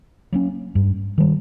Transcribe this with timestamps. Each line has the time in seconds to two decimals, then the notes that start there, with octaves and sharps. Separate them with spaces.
0.32 F#3 A#3 C#4
0.75 G2
1.18 D#3 G3